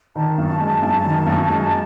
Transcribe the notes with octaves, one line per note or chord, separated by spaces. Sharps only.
D#3 A5
F#2
G#3
F#2
D#3
F#2
G#3